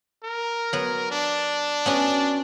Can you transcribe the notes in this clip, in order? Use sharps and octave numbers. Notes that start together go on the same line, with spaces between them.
A#4
F#3 B3
D4
B3 C#4 F#4